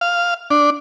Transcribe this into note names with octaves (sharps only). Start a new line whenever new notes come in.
F5
D4